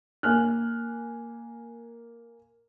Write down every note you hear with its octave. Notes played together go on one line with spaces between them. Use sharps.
A#3 G#5 F6 F#6